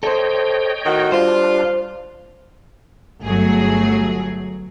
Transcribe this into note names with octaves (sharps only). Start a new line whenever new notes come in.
A4 C5 C#5 D#5 G5
A2 D#3 F#4
G3 D4 F4 C5
G1 F#3 A3 G#4